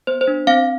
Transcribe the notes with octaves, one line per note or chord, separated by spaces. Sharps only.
B3 C5
C5
D4
C4 F5